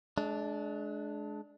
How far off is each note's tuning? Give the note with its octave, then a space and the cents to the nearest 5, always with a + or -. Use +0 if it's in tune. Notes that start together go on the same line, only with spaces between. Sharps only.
G#3 +35 D4 +0